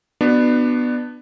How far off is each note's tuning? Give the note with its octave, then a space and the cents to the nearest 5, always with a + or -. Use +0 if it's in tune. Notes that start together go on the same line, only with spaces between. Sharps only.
B3 +0 D4 +25 F#4 -5